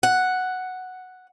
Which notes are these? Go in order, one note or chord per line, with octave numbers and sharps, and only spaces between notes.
F#5